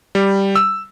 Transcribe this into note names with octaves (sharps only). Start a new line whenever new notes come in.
G3
E6